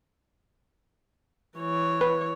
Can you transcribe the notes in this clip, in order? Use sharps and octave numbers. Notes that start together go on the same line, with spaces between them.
E3 C#5
B4